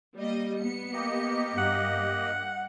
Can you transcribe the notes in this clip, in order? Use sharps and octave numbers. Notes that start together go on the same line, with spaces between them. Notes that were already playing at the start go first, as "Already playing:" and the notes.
G3 A#3 D#5
B3 C#7
A#3 G4 D#5
G2 F#5